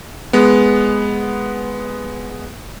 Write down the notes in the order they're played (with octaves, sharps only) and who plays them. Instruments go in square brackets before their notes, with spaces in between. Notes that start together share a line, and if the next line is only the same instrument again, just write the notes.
[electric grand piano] G#3 B3